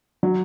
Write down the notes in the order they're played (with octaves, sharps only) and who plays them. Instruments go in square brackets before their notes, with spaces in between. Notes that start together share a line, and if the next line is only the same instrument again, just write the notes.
[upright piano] F#3